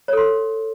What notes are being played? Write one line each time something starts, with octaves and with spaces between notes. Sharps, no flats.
A4 C#5 C6